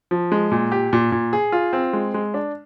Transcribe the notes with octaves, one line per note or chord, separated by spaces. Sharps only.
F3
G#3
A#2
G4
A#2
A#2
G#4
F4
C4
G#3
G#3
D4